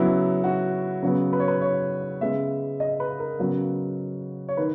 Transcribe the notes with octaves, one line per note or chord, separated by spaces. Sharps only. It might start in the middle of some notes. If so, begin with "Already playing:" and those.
Already playing: C#3 F#3 B3 E4
F#4
C#3 F#3 B3
B4
C#5
B4
C#5
C#3 G#3 B3 E5
D#5
B4
A#4
C#3 F#3 B3
C#5
D#3 B4